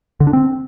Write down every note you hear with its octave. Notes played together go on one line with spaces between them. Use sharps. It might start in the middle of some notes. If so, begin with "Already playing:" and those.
D3
D4
C4